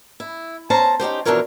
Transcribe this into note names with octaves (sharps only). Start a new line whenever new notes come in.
E4
C#4 C5 A5 A#5
C#4 D#4 G4 C5
F2 B2 E3 D4 A#4 C#5